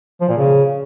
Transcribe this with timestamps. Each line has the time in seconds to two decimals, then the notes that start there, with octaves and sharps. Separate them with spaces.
0.21 F3
0.29 A#2
0.37 C#3